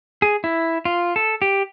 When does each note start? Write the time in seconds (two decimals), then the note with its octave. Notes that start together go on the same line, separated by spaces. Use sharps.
0.22 G#4
0.44 E4
0.85 F4
1.16 A4
1.42 G4